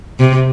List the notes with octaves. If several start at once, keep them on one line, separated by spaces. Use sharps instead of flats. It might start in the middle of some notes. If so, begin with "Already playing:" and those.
C3